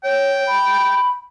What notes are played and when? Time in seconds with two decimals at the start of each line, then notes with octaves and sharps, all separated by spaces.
0.04 C#5 G5
0.47 B5